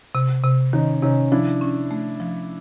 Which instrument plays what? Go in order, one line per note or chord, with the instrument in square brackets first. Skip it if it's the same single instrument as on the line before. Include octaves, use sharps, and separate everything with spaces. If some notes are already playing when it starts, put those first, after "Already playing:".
[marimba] C3
C3
[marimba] D#3 [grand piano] C#4 D#4
[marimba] C3 [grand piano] C#4 D#4
[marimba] F3 [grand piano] D4 E4
[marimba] C#4
A3
F3